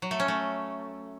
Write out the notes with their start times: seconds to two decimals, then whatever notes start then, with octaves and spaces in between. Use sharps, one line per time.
0.02 F#3
0.11 A3
0.20 C#4
0.28 A3